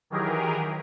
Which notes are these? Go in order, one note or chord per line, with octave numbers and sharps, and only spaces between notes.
D#3 E3 F#3 G4 G#4 A#4